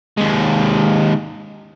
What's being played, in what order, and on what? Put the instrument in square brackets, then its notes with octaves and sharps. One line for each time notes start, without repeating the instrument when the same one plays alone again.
[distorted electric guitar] D#2 G#3